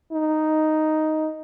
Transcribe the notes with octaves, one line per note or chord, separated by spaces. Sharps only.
D#4